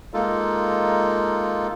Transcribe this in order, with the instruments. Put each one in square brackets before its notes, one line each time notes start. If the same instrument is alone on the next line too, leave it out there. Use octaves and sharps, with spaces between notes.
[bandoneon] G#3 A#3 D#4 F4 A4